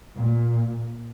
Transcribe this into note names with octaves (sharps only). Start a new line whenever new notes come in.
A#2